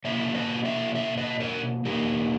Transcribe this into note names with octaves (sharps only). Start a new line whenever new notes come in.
B2 A#3 C#4 C#5 E5
B4 D#5
C#5 E5
C#5 E5
B4 D#5
A#4 C#5
E2 B2 A#3 G4 A#4